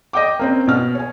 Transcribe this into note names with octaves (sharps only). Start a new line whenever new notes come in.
D#5 G5 D6
A#3 C4 C#4
B2 F6
C#5 G#5